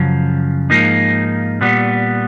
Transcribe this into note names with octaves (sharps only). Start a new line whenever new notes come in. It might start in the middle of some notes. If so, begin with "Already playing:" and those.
Already playing: F#2 C#3 F3
G#2 F3 A#3 D#4
A#2 G3 B3